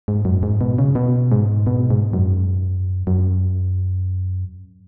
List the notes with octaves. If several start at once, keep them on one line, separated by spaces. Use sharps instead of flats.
G#2
F#2
G#2
B2
C#3
B2
G#2
B2
G#2
F#2
F#2